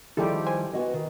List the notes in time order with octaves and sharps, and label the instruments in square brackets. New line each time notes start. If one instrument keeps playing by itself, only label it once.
[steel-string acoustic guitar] D#3 F3 G3 [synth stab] G#3 A4 [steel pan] E4 G4
[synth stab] C5 G#5
[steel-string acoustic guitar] B3 F#4 D#5
D#3